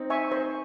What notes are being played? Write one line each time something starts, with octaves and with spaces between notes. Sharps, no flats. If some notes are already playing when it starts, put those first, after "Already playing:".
Already playing: C4 D#4
E5 G#5 C#6
C5